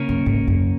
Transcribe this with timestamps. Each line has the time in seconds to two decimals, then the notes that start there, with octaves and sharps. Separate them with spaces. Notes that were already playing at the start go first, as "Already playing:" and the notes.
Already playing: C#3 A#3 C#4 A#4
0.09 F#2
0.26 G#2
0.47 F#2